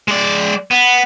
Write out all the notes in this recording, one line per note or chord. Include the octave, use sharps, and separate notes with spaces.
G#3 D5
B3